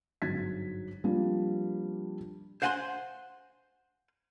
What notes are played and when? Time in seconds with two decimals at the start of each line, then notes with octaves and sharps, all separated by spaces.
0.22 G1 G#2 F#3 G#6 A6 B6
1.04 F3 G3 A#3 C4 D4 F4
2.62 C5 F5 F#5 G#5 A5 C6